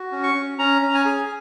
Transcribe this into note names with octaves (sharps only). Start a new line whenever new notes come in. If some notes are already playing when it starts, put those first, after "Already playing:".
Already playing: F#4
C#4
C#6
C#4
C#4 A#5
C#4
G#5
G#4